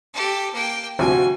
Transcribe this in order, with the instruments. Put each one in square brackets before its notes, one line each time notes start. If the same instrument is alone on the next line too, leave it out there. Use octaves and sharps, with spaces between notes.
[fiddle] G4 A4
A#3 G5
[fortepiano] D2 C3 F3 [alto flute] F#4 [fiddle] G#5